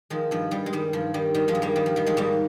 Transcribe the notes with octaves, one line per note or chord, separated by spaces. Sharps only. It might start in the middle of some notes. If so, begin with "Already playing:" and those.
D#3 F3 G#3
G2 F3
G2 G3
G#3
D#3 G3
G2 F3
D#3 G3
D#3 G3
F3 G#3
G2
G3 A#3
D#3 G3
F3
D#3 G3
F3 G#3
G#2 G3 A#3